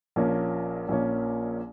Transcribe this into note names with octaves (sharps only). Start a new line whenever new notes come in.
A#1 A#2 F3 A#3 C#4
A#1 A#2 F3 A#3 C#4